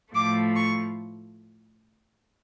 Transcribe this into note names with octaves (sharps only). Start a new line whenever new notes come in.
A2 F3 A3 D6
C#6